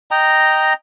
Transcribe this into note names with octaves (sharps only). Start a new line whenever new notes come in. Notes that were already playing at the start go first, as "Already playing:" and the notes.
D#5 G5 A#5